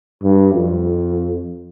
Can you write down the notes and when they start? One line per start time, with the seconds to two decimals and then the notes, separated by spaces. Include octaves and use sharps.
0.23 G2
0.54 F2